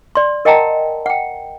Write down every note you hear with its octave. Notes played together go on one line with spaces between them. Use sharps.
D5 C6
A#4 D#5 F#5 G5 A5 A#5
F#5 G5